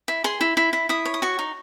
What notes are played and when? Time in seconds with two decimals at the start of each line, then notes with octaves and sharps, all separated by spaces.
0.08 E4
0.24 G#4 C6
0.41 E4
0.57 E4
0.73 E4
0.89 E4 D#6
1.05 C#5
1.14 D#6
1.22 F#4 C#6
1.39 D#4